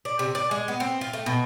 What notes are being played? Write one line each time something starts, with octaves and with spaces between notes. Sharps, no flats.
D5
C3
D5
G#3
B3
C4
F4
A3
B2